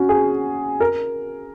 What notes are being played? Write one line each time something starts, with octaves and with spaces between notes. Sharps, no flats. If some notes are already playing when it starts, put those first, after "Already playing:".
Already playing: C#4 F#4
G#4
A#4